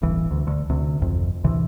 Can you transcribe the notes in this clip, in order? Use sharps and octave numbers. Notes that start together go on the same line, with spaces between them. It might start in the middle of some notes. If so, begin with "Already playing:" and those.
D1 G1 G2 E3
D2
D2
D2 C3
G#1 F2
A1 D2 C3 E3